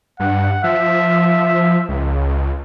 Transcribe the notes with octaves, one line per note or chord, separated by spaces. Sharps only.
G2 F#5
F3 E5
C#2